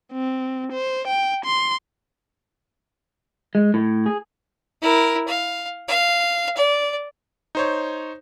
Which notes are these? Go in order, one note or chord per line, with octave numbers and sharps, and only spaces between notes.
C4
C5
G5
C6
G#3
A2
G#4
E4 A#4
F5
F5
D5
D#4 C5 C#5